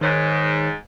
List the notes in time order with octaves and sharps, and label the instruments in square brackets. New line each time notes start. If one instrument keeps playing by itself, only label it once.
[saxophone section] G#2 [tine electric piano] D#3 C#5 F#6